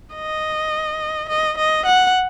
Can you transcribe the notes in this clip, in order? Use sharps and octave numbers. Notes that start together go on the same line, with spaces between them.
D#5
D#5
D#5
F#5